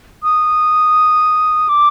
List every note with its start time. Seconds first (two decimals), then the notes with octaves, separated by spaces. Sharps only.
0.23 D#6
1.69 D6